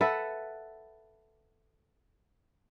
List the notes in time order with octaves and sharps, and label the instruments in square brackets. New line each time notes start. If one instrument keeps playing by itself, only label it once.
[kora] A4 B4 E5 F#5